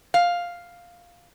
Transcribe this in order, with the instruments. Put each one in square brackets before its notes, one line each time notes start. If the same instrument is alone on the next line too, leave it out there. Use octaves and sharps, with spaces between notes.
[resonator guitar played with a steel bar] F5